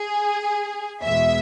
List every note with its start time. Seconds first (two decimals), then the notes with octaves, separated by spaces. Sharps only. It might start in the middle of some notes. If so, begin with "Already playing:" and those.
Already playing: G#4
1.02 E2 B2 G#3 E5